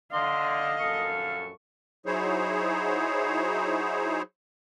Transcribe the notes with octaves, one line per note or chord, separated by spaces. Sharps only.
D3 D#5 F5 C6
A#1 F#2 A4 C#6
F#3 D#4 E4 G#4 C5 C#5